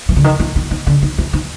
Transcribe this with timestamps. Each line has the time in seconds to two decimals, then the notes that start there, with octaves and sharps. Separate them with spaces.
0.09 E3
0.16 D3
0.24 D#3
0.40 E3
0.56 D#3
0.71 D#3
0.87 D3
1.02 D#3
1.18 E3
1.33 D#3